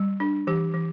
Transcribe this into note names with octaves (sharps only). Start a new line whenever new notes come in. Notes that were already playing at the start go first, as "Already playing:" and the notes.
Already playing: G3
D4
E3 G4
E3